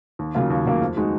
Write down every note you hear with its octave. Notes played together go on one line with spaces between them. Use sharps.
D#2
C#3 F#3 A#3 F4
D#2
C#3 F#3 A#3 F4
F2
D#3 G#3 D#4 F#4